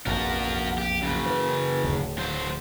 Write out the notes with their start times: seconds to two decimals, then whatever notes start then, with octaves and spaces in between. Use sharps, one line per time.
0.07 F1 A#1 E2 F#4 A#4
0.78 G4
1.02 F#2 C#3
1.26 E3
1.84 D1 A2
2.18 F#3 C5